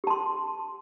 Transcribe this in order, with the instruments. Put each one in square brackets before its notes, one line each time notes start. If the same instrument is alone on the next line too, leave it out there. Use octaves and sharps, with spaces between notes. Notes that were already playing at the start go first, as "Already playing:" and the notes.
[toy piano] G4
A5
C6